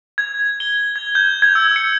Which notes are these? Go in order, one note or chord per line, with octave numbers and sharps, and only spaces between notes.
G#6
G7
G#6
G6
G#6
E6
C#7